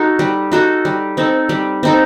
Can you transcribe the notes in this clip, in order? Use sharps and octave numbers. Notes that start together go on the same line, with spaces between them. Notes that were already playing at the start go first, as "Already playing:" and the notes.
Already playing: D#4 F#4 A4
G3
D#4 F#4 A4
G3
C4 D#4 A4
G3
C4 D#4 A4